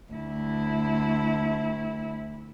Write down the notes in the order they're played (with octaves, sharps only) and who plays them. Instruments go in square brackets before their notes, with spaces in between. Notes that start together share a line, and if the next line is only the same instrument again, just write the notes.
[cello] D2 E4